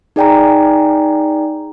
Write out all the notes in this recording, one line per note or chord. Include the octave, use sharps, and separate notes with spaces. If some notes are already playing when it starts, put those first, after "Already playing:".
D#4 G#4 D5 G5 G#5 A#5